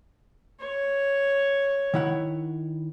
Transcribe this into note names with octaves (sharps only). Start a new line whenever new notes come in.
C#5
D#3 E4 F#5